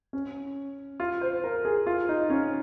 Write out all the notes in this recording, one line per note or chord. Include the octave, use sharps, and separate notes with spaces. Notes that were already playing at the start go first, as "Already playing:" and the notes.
C#4
F4
C5
A#4
G#4
F4
D#4
C#4